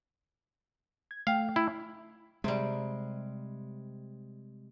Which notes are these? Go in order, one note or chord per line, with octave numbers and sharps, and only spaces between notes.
G#6
A3 F5 G5
E4
C3 G3 G#3